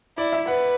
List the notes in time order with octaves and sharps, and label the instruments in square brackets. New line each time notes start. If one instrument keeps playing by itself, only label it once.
[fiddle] E4 [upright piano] D5
[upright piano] E5
[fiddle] B4 [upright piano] F#5